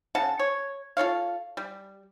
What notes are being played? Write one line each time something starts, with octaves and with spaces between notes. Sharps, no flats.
C#3 F#5 A5
C#5
F4 A4 C#5 F5
G3